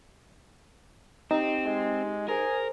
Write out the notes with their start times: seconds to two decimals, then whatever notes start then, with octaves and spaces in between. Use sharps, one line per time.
1.31 C4 D#4 G4
1.65 G#3
2.28 G#4 A#4 C5